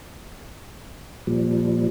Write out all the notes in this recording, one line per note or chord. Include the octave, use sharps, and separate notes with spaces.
A#2 F3 G3